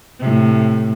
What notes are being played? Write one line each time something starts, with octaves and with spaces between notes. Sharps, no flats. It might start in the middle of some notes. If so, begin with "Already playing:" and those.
A2 C3